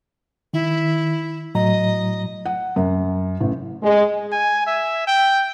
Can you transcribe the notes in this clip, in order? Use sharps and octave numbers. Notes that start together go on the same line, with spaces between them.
D#3 E4
A2 F#3 D#5 A#5
F#5
F#2
A1
G#3
G#5
E5
G5